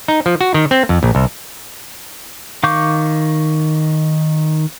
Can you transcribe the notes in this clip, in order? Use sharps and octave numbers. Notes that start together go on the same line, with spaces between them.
D#4
F3
F#4
D#3
C4
F2
A#1
C2
D#3 F5 C#6 D6 G6